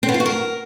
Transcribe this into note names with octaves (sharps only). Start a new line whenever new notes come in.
C4
B3
F4
F#4
A#4